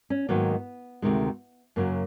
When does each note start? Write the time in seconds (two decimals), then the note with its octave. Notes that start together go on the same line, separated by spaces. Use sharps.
0.10 C#4
0.29 G#2 D#3 F#3 A#3 B3
1.02 D2 C3 D#3 G#3
1.76 F#2 C#3 F#3 A#3